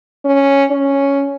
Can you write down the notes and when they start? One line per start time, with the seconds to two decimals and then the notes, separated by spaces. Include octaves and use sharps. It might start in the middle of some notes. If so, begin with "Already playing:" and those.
0.25 C#4
0.70 C#4